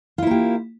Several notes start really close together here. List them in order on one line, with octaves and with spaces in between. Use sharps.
F4 E4 A#3 G4